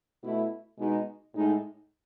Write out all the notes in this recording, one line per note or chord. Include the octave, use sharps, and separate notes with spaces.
B2 A3 E4
B2 G#3 D#4
A2 G#3 D#4